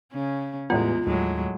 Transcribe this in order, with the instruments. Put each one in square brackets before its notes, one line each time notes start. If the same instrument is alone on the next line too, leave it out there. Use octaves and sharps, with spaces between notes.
[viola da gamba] C#3 C#4
[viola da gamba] E2 G#3 [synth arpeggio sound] A2 G3 B3 [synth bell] F4
[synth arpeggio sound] D#2 [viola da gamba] A2 F#3 G#3